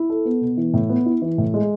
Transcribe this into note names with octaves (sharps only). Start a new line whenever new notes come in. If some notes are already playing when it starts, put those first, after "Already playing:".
Already playing: E4
A4
B3
B2
E3
A2
B3
E4
E3
A2
G#3